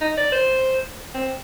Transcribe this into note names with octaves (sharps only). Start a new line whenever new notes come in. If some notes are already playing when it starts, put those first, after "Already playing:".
D#4
D5
C5
C4